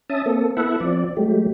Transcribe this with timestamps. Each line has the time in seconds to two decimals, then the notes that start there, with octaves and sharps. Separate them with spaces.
0.09 C#4 E5 A5 D#6
0.26 A#3 C4 A4
0.57 B3 E4 A4 E5 F#5
0.80 F3 C4 D5
1.17 F#3 G#3 A3 G4